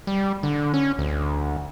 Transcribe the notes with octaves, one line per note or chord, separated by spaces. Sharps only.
G3
D3
C#4
D2